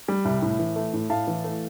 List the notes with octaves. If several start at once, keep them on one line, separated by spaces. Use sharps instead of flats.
G3
C2
A2
E3
A3
A2
A2 F5 A5
E3
A3